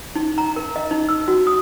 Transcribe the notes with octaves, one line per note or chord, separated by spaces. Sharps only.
D#4
A#5
A#4
D#5
D#4
E6
F#4
D#6